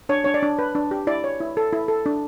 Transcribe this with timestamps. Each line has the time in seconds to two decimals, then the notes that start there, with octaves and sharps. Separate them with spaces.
0.09 D4 C#5
0.24 D4 C#5
0.34 D5
0.42 D4
0.59 B4
0.75 D4
0.91 G4
1.07 E4 D5
1.24 C#5
1.40 E4
1.57 A4
1.73 E4
1.88 A4
2.06 D4